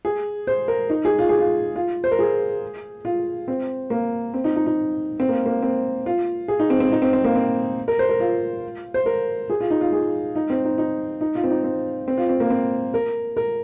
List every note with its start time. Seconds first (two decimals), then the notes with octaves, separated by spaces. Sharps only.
0.05 G#4
0.47 C5
0.68 A#4
0.90 D#4
1.05 G#4
1.19 F4
1.29 G#4
1.39 F4
1.76 F4
2.04 C5
2.11 A#4
2.19 G#4
3.05 F4
3.48 C4
3.90 A#3
4.34 C4
4.44 D#4
4.56 D#4
4.66 D#4
5.20 C4
5.29 A#3
5.46 A#3
5.62 C4
6.06 F4
6.48 G#4
6.59 D#4
6.70 C4
6.80 C4
6.92 D#4
7.02 C4
7.13 C4
7.24 A#3
7.35 C4
7.88 A#4
7.99 C5
8.09 A#4
8.20 F4
8.94 C5
9.06 A#4
9.50 G#4
9.61 F4
9.71 D#4
9.81 F4
9.93 G#4
10.36 D#4
10.50 C4
10.65 D#4
10.78 D#4
11.21 D#4
11.35 F4
11.44 C4
11.50 D#4
11.64 C4
12.08 C4
12.17 F4
12.29 C4
12.40 A#3
12.50 C4
12.94 A#4
13.37 A#4